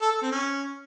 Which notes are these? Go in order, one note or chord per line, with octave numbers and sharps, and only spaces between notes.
A4
A4
C4
C#4